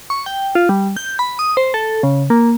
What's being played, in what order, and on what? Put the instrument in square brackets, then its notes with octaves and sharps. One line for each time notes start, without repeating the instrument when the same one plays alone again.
[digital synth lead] C#6
G5
F4
G3
G6
B5
D#6
C5
A4
C#3
A#3